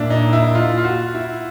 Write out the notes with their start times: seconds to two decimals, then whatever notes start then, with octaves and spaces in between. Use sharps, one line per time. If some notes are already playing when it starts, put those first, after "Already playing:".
Already playing: A#2 D4 E4
0.10 D#4
0.33 E4
0.55 F4
0.78 F4
0.84 F#4
1.15 E4